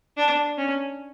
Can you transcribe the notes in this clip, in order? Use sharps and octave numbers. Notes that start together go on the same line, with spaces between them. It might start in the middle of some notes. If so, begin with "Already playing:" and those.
D4
C#4